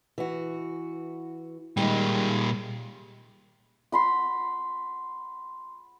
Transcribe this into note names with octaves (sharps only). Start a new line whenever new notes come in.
E3 F#4
A#2 D#3 G3 G#3 G5
F#5 B5 C6